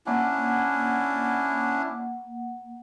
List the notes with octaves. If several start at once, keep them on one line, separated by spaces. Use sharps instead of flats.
A#3 C#4 D4 E4 F#5